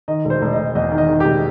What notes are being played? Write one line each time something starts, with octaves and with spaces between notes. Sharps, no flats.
D#3 D#5
E1
C5
E1
D#5
E1
E2 D#5
D#3
D#5
D#3
E1 G4